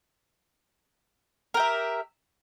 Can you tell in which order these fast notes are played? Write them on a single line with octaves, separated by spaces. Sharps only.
A#4 G4 E5